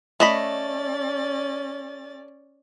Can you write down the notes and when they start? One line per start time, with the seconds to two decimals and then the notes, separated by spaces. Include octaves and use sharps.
0.20 A3 C#4 D5 D#5 B5 A6